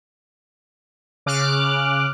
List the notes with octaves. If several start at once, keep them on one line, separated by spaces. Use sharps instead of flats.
C#3 D6 F6 F#6